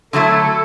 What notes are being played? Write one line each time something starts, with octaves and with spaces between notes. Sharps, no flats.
D3 F#3 A3 E4 A4